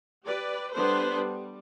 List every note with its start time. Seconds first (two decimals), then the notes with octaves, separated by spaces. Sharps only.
0.24 G4 B4 D5
0.73 G3 B3 D4 A4 B4 C5
1.15 G3